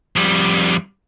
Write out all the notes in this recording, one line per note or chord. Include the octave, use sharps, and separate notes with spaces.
F2 G3